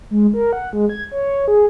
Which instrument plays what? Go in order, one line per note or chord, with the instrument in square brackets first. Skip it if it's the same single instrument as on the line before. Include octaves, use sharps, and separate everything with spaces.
[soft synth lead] G#3
A#4
F#5
G#3
G#6
C#5
G#4